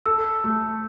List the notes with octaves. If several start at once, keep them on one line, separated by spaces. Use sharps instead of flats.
A4 E6
A3